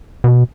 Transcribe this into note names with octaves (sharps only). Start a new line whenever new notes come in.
B2